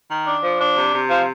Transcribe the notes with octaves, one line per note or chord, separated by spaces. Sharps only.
D#3
D4
F3
D4
C3
C3
F3